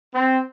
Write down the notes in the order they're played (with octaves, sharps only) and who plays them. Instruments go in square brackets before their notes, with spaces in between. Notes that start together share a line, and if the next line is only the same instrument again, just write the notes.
[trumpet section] C4